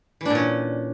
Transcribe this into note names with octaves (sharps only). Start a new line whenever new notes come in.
A#2 E3 C#4 D4